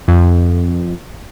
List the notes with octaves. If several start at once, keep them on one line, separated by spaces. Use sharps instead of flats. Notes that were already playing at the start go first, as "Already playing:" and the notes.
F2